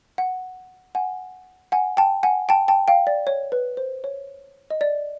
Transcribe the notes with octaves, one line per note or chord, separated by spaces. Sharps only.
F#5
F#5 G#5
F#5 G#5
G5 A5
F#5 G#5
G5 A5
G5 A5
F5 G5
D5
C#5
B4
C5
C#5
D#5
D5